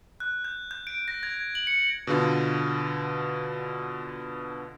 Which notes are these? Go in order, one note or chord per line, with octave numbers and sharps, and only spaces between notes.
F#6
G6
G6
D7
A#6
G#6
F#7
C#7
B2 D3 F4